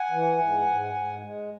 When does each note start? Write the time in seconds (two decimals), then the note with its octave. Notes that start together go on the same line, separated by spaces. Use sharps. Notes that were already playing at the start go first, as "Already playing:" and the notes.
Already playing: F#5 G#5
0.11 E3
0.38 G#2
0.66 G#2
0.94 G#2
1.22 G#3